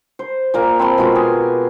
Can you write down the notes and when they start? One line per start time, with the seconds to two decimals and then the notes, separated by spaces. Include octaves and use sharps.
0.19 C5
0.54 A#2 A#3 F5
0.79 C4 A5 B5 C6
0.98 B2 G#3 F4 A#4
1.12 G4 G#4